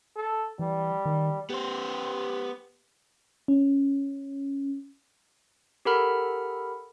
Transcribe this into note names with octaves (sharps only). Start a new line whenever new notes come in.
A4
E3 G3
D#3
B3 G4 C5
C#4
G4 A4 A#4 F#5 B5 F6